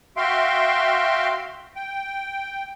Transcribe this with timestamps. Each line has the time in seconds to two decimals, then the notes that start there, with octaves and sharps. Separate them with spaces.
0.17 F#4 E5 F5 G5 C6
1.76 G5